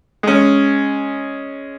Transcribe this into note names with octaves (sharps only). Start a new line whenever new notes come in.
G#3 C#4